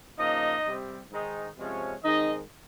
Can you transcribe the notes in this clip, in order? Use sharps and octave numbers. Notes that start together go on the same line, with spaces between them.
C#3 F3 A#3 D#4 D#5
C3 G3 C4
G#2 D#3 G#3 D#4
C3 F3 G#3 C#4
D#3 G#3 C4 D#4 D#5